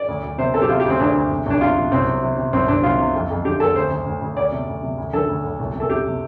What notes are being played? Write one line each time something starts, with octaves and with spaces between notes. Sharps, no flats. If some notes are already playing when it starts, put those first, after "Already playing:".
Already playing: D5
D2
D2
C3 C5
C3 A4
G4
C3 F4
G4
D2
C4
D2 D4
D2
C3
C2 D4
C3 F4
C3
C2 C4
C3
C3
C3
C2 C4
C2 D4
C2 F4
C3
F2
F2
D3 G4
F2 A4
D2 C5
D2
D2
D2
D2 D5
C3
D2
C3
D2
D3 A4
D2
D2
C2
C3
A4
C3 G4
C3